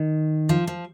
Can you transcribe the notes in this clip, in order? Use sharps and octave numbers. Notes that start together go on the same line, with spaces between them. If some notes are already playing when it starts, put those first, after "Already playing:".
Already playing: D#3
F3
F3